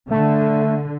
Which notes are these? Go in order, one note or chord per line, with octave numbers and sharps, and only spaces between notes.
D3 A3